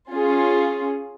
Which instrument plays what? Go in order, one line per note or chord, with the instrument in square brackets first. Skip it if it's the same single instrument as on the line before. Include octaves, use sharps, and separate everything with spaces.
[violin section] C#4 F4 G#4